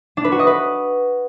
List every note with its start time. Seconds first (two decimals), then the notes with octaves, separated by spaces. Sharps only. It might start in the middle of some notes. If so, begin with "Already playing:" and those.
0.17 D4
0.25 B4
0.32 F#4
0.39 D#5
0.47 B4